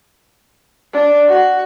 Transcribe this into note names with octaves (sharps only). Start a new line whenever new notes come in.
D4
F#4